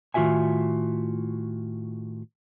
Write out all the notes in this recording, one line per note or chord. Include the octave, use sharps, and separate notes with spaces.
A2 D#3 F4 F#4 E5 G#5